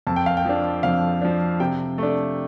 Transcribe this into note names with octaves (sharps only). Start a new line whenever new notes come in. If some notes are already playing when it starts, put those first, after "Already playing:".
F2 A5
G5
F5
G5
F3 D4
F2 F5
F3 D4
C3 G5
A3 D4